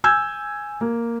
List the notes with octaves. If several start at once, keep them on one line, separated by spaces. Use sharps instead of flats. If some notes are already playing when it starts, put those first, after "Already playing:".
G#5 E6 G6 G#6
A#3